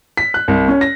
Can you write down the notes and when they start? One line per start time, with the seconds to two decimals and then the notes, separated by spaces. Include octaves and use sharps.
0.17 B6
0.34 F#6
0.48 C2
0.68 C#4
0.81 A#6